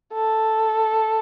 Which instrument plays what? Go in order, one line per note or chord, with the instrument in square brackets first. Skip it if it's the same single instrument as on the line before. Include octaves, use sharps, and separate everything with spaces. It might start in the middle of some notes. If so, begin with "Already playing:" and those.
[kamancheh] A4